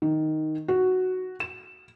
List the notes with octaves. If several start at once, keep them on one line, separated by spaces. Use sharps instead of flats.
D#3
F#4
E7